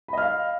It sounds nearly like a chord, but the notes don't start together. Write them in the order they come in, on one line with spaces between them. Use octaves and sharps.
B5 D#5 F6 F5